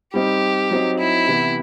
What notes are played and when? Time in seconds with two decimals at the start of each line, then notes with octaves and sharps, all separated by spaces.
0.14 G3 C4 D#4 G4
0.71 F#3 C4 D#4
0.99 E4
1.27 C3 E3 B3